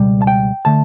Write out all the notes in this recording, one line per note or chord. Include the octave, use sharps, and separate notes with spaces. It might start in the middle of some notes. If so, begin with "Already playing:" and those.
Already playing: C#2 B2 G3
A5
G5
D3 A3 A5